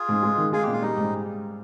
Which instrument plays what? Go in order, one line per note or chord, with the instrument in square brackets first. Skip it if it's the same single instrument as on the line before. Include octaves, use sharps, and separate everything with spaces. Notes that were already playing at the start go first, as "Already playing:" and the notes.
Already playing: [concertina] F4 G#4
[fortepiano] G#2
G#3
D#3
[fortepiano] G#3 [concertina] F4 G#4
[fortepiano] A#2 [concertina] G4
[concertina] F4
[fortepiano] G3 [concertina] D#4
[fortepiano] G#2